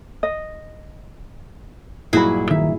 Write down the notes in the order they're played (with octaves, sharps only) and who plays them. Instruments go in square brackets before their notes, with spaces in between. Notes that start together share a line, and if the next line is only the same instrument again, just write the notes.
[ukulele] D#5
[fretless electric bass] G2 A#2 F#3 [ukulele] D#4 F#4 B5 [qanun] E4 G#4
[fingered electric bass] D#3 [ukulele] E5